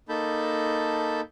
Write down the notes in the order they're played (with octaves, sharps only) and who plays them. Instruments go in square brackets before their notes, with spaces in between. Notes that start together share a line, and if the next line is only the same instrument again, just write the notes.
[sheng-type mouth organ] A#3 D#4 A4 A5 B5 G6